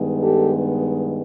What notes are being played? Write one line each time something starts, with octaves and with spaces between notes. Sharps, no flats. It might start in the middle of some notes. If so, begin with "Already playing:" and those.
Already playing: G2 D#3 G#3 B3
G4 A4